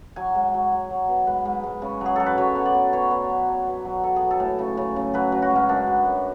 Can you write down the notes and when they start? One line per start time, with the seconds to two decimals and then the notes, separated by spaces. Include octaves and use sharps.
0.16 F#3 G#5
0.35 G#2
0.54 F#3
0.72 F#3
0.90 F#3
1.08 B2
1.27 G#2 B4
1.45 G#2
1.64 G#2
1.82 C#3
2.01 F#3 G#4
2.16 F#3 A4
2.26 B4
2.38 F#3 C#5
2.55 B2
2.65 D5
2.74 B2
2.93 B2 C#5
3.11 B2
3.30 F#3
3.48 F#3
3.67 B2
3.85 F#3
4.03 F#3 A4
4.16 G#4
4.22 F#3
4.31 A4
4.40 A2
4.59 C#3
4.77 C#3
4.96 C#3
5.14 F#3 B4
5.32 F#3
5.42 F#4
5.50 G#2
5.56 C#4
5.69 F#2 D4
5.87 F#3
6.06 F#2